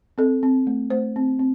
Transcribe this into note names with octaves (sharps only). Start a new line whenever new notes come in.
C4 A4
C4
A3
A3 C5
C4
C4